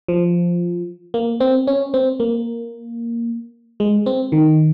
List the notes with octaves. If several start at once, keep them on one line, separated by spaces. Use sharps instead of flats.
F3
A#3
C4
C#4
C4
A#3
G#3
C4
D#3